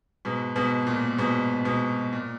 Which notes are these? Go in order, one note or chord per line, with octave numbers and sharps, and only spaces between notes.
G#2 B2
G#2 B2
A#2
G#2 B2
G#2 B2
A#2